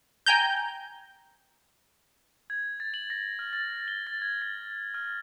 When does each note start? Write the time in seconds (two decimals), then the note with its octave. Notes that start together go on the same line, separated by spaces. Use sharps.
0.26 G5 G#5 A#5 G6
2.50 G#6
2.80 A6
2.94 F#7
3.10 A#6
3.39 F6
3.53 A6
3.88 G7
4.07 A6
4.22 G#6
4.42 A6
4.94 F6